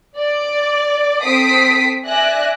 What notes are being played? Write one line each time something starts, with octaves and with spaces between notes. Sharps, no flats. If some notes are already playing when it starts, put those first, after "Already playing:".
D5
C4 A4 D#6 B6 C7 D7
D5 E5 G#5 F#6 A#6